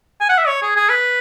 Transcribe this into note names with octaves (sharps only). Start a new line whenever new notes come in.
G#5
F#5
E5
C#5
G#4
G#4
B4